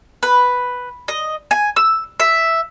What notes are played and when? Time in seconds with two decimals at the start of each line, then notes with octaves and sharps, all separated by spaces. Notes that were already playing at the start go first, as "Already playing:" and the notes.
0.23 B4
1.08 D#5
1.51 G#5
1.76 E6
2.20 E5